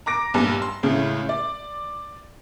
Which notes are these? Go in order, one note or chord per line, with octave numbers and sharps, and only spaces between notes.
A#5 D6 A#6 D7
B1 G2 A#2
C6
C#2 A2 C#3
D5